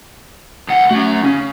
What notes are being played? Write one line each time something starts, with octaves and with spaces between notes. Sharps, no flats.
C#2 F#5
A3 C#4 F#4
C#3 C#4